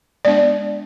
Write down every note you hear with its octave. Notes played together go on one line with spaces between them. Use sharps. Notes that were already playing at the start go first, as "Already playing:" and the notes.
G#3 B3 D4 D5